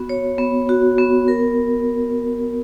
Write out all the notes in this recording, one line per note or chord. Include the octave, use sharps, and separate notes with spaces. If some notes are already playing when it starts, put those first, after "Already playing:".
Already playing: B3 F#4
C#5
B3
F#4
B3
A#4